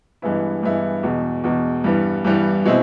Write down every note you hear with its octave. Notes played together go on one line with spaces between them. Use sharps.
G2 E3 G#3 B3 E4
G2 E3 G#3 B3 E4
E2 B2 G#3
E2 B2 G#3
G2 E3 G3 B3
G2 E3 G3 B3
B2 G#3 C4 E4